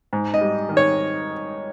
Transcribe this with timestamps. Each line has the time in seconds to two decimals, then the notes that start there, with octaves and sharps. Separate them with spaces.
0.13 G#2
0.34 D#5
0.41 G3
0.69 D#3
0.77 C#5